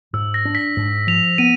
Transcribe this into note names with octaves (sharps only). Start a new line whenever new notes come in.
G#2 E6
A#6
D4
B6
G#2
F3 F7
B3 D#7